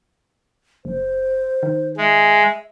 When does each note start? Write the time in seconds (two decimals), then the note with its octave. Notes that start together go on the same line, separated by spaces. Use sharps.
0.85 F#1 C5
1.63 D#3
1.97 G#3 E5